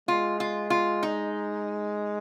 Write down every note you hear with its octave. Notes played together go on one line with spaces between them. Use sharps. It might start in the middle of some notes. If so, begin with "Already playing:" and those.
G#3 F4
F4
F4
D#4